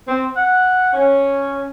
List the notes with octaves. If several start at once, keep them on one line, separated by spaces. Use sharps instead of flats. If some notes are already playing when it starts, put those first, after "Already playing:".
C4
F#5
C#4